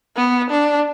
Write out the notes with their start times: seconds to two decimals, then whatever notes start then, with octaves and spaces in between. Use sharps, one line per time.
0.16 B3
0.50 D4